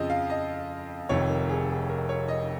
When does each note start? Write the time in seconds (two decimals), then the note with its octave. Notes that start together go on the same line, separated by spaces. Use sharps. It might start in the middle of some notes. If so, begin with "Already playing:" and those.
Already playing: F2 C#3 F3 D#5
0.10 F5
0.30 D#5
1.09 F1 F2 D#3 C#5
1.30 A#4
1.49 G#4
1.70 G#4
1.89 A#4
2.09 C#5
2.28 D#5